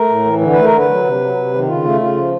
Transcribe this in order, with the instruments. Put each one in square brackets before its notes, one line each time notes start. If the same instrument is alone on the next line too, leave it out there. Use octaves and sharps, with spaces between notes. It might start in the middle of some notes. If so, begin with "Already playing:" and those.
Already playing: [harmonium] A3 A#4
A2
E3
D3
A3 B4
A#4
D3
B4
F#3
C3
F#3
C3
D#3
C#3 F4
A3
C#3 F4
F3